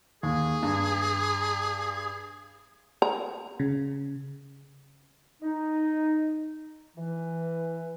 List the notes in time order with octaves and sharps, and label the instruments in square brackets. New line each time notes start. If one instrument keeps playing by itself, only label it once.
[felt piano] D#2 [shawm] G#4
[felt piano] G2
[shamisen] A#5
[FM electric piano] C#3
[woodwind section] D#4
E3